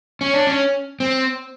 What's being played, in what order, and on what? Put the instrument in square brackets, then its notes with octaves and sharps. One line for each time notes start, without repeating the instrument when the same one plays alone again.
[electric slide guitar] C#4
D4
C#4
C4